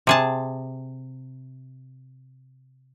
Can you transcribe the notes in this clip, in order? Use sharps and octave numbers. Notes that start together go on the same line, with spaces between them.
C3 G#4 A5